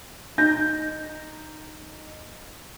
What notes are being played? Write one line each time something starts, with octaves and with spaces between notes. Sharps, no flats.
D#4 G6 A#6